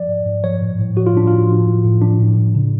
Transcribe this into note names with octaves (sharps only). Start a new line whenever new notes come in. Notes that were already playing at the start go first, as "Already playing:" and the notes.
Already playing: F3 D5
G#2
G#2
F3 C#5
A2
A2
F3 F#4
F4
A2 D4
A2 F4
F3
A2
A2
F3 D4
A2
A2
C#3